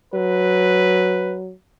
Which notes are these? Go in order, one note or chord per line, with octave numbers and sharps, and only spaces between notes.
F#3 B4